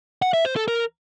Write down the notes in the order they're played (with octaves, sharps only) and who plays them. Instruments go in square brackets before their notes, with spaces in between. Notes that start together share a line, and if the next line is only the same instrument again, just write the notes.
[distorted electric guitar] F#5
E5
C5
A4
A#4